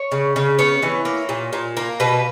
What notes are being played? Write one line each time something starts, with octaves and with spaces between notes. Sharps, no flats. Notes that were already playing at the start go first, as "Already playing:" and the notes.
Already playing: C#5
C#3
C#3
B3 C#5
E3
A#3
A#2
A#2
A#3
B2 B4